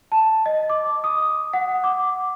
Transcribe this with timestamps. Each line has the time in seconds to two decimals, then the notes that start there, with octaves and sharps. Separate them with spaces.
0.12 A5
0.46 D#5
0.70 D6
1.04 D#6
1.53 F#5
1.84 D6